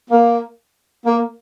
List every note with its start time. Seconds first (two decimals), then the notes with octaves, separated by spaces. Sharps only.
0.11 A#3
1.06 A#3